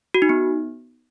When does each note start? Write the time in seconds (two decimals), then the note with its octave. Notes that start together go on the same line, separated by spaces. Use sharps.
0.14 F#4
0.22 D#4
0.29 B3